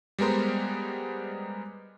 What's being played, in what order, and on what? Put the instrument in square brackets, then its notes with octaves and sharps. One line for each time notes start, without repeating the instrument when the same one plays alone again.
[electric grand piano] G3 G#3 B3 A#4 C5